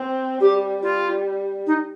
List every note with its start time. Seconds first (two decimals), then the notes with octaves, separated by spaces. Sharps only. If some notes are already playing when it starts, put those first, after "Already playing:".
Already playing: C4
0.41 G3 G4
0.83 G3 F4
1.67 D#4